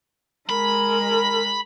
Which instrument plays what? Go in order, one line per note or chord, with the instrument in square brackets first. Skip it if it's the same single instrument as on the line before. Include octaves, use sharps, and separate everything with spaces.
[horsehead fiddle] G#3 A#4 [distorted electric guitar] B5